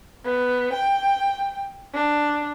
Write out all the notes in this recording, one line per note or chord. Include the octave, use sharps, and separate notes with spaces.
B3
G5
D4